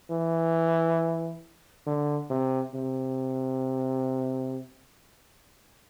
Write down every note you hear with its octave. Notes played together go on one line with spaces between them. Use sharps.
E3
D3
C3
C3